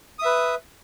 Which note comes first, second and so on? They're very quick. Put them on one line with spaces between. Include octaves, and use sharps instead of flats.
D#6 E5 B4